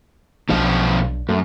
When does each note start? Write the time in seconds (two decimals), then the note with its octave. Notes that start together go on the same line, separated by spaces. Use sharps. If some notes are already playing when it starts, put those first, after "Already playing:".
0.49 B1 B2 F3 D4 F5
1.29 F#2 A3